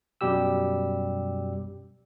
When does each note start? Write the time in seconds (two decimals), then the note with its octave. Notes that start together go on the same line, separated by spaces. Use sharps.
0.21 F#2 B2 G3 G4 E6